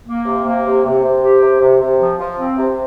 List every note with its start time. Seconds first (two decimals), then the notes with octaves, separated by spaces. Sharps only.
0.07 A#3
0.25 C3
0.46 A#3
0.65 C3
0.84 C3
1.03 C3
1.22 G4
1.41 C3
1.60 C3
1.80 C3
1.99 F3
2.19 F3
2.38 C4
2.57 C3